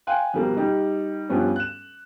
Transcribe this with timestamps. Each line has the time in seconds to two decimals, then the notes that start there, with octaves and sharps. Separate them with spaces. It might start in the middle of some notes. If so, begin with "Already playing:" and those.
0.07 F5 G5 G#5 C6 F#6
0.34 F2 B2 G3 A#3
0.56 G3 D#4 G4
1.29 G2 F3 G3 B3 C#4
1.56 F#6 E7